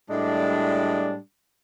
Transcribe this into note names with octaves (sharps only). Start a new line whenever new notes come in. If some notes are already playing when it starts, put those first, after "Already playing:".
A2 G3 G#3 D4